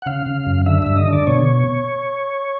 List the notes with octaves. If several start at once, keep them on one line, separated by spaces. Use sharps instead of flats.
F#5
C#3 F5
C#3
F#2
D3 E5
G2 E5
D#5
D3 D5
B2 C#5